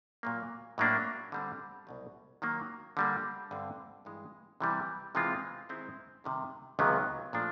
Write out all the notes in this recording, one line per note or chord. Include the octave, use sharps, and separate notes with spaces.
A#2 F#3 A#3
A2 F#3 A#3 D4
D3 G3 C4
C2 B2 F#3
D#3 F#3 A#3
D3 G3 A#3
G2 D3 G3 C4
G2 E3 G#3
C3 E3 G3
C3 E3 G#3 C4 F4
D#3 G#3 C4 E4
C3 D#3 G3
C#2 C3 D#3 F#3 B3
A#2 F3 A3 D4